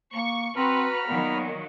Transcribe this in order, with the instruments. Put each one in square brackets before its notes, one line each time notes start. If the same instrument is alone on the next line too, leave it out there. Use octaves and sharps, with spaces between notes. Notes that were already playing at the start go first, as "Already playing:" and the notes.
[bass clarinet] A#3 [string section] C#6
[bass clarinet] C4 [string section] F#4 B4 [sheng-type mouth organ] A#5 B5 F6
[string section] A#2 D#3 F#3 [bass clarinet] B3